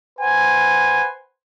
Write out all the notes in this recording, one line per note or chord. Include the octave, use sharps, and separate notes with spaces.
B4 C5 F#5 G#5